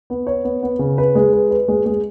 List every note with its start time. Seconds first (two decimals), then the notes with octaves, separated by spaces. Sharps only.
0.10 B3
0.27 C#5
0.44 B3
0.63 B3
0.79 C#3
0.98 B4
1.15 G#3
1.33 B4
1.51 B4
1.68 G#3
1.86 G#3